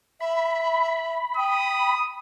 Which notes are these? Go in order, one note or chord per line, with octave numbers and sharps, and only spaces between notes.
E5 B5
G5 D#6